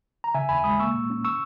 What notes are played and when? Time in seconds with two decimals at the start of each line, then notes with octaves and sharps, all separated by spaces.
0.24 A#5
0.34 C#3 E5 G#5
0.49 D#2 G#5 B5
0.64 G#3 B5 D#6
0.80 A#3 C#6 E6
0.94 A#2
1.10 C#4
1.25 C#6 E6